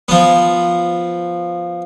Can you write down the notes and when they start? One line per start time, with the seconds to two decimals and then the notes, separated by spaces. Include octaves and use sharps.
0.08 F3 B3